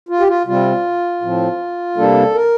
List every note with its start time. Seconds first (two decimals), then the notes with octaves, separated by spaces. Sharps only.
0.09 F4
0.20 G4
0.28 F4
0.46 C3 G3 C4 F4
1.22 A2 F3 C4
1.97 C3 G3 A#3 D4 A4
2.35 A#4